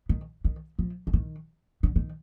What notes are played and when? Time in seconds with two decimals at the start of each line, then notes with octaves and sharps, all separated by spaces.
0.09 D#3
0.44 D#3
0.79 F3
1.07 D3
1.13 D#3
1.83 D3
1.96 D#3